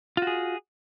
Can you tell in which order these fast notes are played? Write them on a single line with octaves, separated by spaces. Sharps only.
F4 F#4 G#4